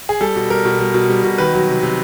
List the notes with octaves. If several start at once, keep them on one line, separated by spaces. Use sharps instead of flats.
G#4
G3 A4
B2
G3 A#4
B2
G3
B2
G3
B2
D#3 B4
F#3
C3
C3